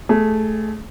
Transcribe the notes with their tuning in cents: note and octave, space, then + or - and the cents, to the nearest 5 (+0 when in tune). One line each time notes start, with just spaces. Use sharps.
A3 -15 G#4 +0